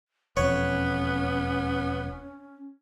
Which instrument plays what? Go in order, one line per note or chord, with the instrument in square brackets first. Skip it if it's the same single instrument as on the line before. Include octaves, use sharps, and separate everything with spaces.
[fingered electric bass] E1 F2 [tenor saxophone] B3 [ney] C#4 [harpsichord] C#5